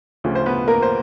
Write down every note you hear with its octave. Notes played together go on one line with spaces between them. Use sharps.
D2 C#3 F3
C5
B3 B4
A#3 A#4
C5